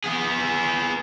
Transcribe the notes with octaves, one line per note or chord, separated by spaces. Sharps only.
B3 G#4